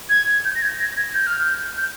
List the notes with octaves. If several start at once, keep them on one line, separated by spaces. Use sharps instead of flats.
G#6
G6
A#6
G#6
A#6
G#6
G6
F6
G6
G6